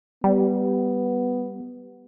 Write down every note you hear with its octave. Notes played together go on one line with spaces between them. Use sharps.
G3 B3